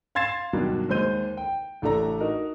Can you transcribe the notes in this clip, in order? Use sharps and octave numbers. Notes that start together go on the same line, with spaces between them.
F5 C6 G#6 A6 C7 E7
G2 B2 D#3 F#3 G3
D#2 G#3 C5 G6 D#7
G5
A1 A3 D4 A4 A#5 A#6
D#4 F#4 A#4 D#5